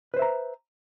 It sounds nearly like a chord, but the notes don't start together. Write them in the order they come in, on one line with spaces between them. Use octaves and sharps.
B4 C5 E5 A#5